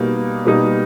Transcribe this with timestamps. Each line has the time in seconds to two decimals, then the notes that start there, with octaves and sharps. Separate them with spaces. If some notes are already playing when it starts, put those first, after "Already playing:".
Already playing: B2 G3 A#3 D#4
0.45 B2 G3 A#3 D#4